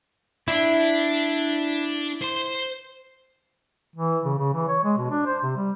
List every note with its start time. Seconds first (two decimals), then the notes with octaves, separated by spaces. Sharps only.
0.48 D4 E4
2.21 C5 C6
3.96 E3
4.25 C#3
4.38 C#3
4.53 E3
4.68 C#5
4.84 G#3
4.98 B2
5.11 D4
5.26 C5
5.43 C3
5.56 G3